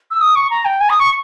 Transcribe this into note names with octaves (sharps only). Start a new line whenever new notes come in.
E6
D#6
C#6
A#5
G5
G#5
D#6
C#6